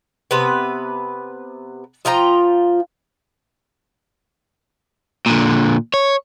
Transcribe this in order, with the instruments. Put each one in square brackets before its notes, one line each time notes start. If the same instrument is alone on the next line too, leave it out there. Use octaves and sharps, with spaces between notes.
[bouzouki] C3 B3 B4
F3 F4 G5 A#5
[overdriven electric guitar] A#2 D3
C#5